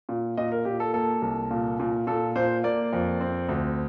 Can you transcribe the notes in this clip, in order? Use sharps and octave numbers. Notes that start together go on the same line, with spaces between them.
A#2
A#2 D#5
A#4
A#2 G4
A4
A#3 A4
C2
A#2
A#2
A#2 A4
A#2 C5
A#3 D5
F2
C4
D2